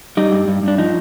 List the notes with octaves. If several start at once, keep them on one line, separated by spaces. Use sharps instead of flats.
G3 D#4
G2
G2
G2 D4
F3 D#4